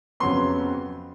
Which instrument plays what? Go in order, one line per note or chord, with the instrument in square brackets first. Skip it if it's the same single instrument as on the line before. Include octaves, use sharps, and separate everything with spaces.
[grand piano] F2 C#3 F#3 B3 C6